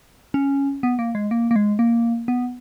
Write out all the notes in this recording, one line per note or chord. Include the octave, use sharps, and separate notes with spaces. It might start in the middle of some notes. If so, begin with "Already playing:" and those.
C#4
B3
A#3
G#3
A#3
A#3
G#3
A#3
B3